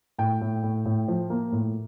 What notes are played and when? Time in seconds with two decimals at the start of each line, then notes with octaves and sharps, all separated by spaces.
0.18 A2 G5
0.41 A2
0.63 A2
0.86 A2
1.08 F3
1.30 A#3
1.52 A2